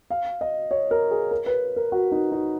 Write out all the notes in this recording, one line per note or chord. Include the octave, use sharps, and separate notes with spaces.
F5
D#5
C#5
A#4
G#4
A#4
B4
A#4
F#4
D#4
D#4